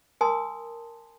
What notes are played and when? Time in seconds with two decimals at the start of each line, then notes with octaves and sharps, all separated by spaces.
0.21 A#4 G#5 A5 C6 D#6